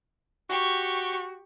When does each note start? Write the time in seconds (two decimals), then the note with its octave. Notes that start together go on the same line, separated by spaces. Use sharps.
0.49 F#4 G4 C#6